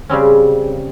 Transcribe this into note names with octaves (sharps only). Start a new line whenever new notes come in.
C#3 G3 C4 C#4